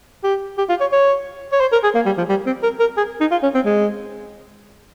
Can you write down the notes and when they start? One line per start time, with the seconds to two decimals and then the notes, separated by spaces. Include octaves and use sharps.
0.24 G4
0.58 G4
0.69 F4
0.81 C#5
0.92 C#5
1.52 C#5
1.61 C5
1.72 A#4
1.84 G#4
1.95 A#3
2.06 G3
2.18 F3
2.29 G3
2.46 C4
2.63 A#4
2.80 A#4
2.97 G#4
3.20 D#4
3.31 F4
3.43 C#4
3.55 C4
3.66 G#3